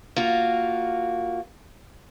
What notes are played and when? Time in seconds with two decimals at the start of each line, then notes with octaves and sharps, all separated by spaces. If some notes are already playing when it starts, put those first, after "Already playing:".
0.16 A#3 F4 F#4